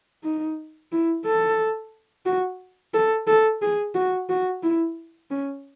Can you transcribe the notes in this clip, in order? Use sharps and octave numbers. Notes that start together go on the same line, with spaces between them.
D#4
E4
A4
F#4
A4
A4
G#4
F#4
F#4
E4
C#4